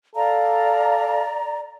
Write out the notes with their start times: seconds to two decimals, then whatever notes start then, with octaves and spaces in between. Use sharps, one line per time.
0.16 A4 D5 F5 A#5